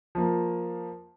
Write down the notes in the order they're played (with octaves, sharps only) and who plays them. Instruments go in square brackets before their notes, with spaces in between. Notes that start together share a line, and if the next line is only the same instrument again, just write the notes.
[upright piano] F3 A#3